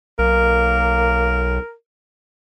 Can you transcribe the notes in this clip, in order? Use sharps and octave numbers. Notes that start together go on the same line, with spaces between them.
B1 A#3 A#4